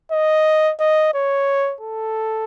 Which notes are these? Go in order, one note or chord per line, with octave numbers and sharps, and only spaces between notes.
D#5
D#5
C#5
A4